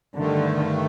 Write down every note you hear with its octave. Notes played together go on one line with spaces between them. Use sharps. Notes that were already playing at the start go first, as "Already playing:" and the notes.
G2 D3 D#3 A3